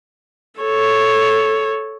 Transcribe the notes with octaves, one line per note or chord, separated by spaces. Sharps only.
A4 C#5